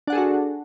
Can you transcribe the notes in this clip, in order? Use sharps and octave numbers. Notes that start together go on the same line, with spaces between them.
D4 F#4 G#4 A4 F#5